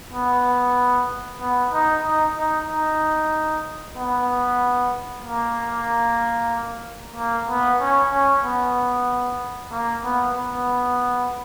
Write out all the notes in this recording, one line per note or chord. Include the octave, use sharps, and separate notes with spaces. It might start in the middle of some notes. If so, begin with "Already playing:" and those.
B3
B3
D#4
D#4
D#4
D#4
B3
A#3
A#3
B3
C#4
C#4
B3
A#3
B3
B3